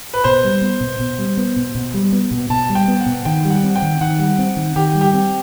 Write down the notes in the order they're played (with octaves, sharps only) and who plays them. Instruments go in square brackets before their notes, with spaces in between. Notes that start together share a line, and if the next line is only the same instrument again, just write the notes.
[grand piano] B4
[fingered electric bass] B2 [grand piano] C5
[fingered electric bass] G3
B3
B2
B2
G3
B3
B2
B2
G3
B3
B2
[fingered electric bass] B2 [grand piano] A5
[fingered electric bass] G3
[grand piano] G5
[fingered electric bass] B3
[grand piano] F#5
[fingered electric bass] B2
[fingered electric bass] D#3 [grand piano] G5
[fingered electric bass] G3
[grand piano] F#5
[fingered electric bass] C4
[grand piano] G5
[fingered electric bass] D#3
[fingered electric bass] D#3 [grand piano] F#5
[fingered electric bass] G3
C4
D#3
[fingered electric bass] D#3 [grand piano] G4
[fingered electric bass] G3
[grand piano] G4
[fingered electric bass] C4